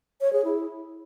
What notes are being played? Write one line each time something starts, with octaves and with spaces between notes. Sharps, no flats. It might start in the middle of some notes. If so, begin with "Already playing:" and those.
C#5
G#4
E4